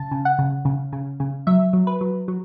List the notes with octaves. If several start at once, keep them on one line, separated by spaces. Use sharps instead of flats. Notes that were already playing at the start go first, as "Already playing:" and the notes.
Already playing: C#3 A5
C#3
F#5
C#3
C#3
C#3
C#3
F#3 E5
F#3
B4
F#3
F#3